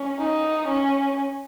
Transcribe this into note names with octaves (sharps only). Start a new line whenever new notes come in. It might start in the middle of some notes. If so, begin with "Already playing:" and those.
Already playing: C#4
D#4
C#4